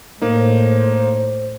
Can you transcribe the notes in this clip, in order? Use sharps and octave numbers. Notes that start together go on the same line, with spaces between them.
A2 A#3 D#4 C5